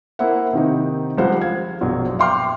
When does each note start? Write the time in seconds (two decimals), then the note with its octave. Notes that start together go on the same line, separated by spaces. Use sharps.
0.19 A#3 E4 C5 E5 F#5
0.53 C3 D#3 D#4
1.18 C#2 F3 G3 C5 F5 F#5
1.41 F5 G#6
1.81 A#1 F#2 B2 F#3
2.19 E5 F5 G5 C6 D6 F6